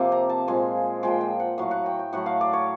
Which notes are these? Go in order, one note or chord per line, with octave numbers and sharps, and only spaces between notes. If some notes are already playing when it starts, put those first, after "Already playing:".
Already playing: C3 F3 A#3
A#5
A5
A#2 F3 G#3 G#5
A#2 F3 G#3 G5
G5
F#5
A2 F#3 A3 F5
F#5
G5
G5
A2 F#3 A3 F#5
F5
D5
C#5